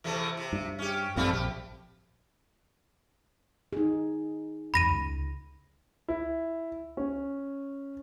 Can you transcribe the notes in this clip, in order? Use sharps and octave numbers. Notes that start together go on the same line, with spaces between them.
E2 C3 A3
C3
G2
C#4 G4
A1 F#2 F3 G3 A3 C4
A#1 G4
D#4 G#4
F#1 E2 B5 A#6 D#7
C#2
E4
C#4